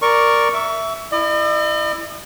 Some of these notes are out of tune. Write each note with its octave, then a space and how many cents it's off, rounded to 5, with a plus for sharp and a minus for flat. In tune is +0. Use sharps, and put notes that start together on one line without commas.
A#4 +0 D5 +0 C#6 +0
E5 +0 C#6 +30
E4 +10 D#5 -45